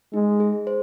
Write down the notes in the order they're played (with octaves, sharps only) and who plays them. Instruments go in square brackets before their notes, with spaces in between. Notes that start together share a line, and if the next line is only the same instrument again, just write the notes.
[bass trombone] G#3 [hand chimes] D#4
[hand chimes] G#4
C5